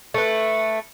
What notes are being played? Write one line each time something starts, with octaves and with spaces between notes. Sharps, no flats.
A3 B4